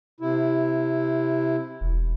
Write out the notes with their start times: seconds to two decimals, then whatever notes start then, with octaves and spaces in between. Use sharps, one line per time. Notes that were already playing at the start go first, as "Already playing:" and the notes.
0.20 C3 E4
1.81 E1